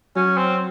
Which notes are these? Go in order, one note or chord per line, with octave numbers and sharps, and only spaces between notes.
F#3 C#4
C4